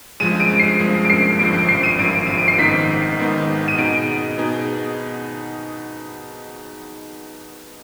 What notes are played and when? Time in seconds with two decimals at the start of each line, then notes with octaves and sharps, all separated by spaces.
0.20 G2 F3 G#3 D#7
0.40 D7
0.59 C7
0.79 G2 F3 G#3
1.05 D7
1.10 C7
1.39 G#1 G2 F3 D7
1.55 D7
1.69 C7
1.83 D#7
1.99 G#1 G2 F3 D7
2.27 D#7
2.37 D7
2.48 C7
2.58 G#1 G#2 D#3 B3 D#4 B6
3.18 G#1 G#2 D#3 B3 D#4
3.68 D#7
3.77 B2 B3 D#4 G#4 D7
4.37 B2 B3 D#4 G#4